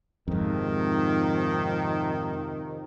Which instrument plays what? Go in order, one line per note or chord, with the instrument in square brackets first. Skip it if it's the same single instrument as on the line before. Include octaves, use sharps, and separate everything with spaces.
[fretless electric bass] F2 G#2 [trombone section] C3 D#3 F3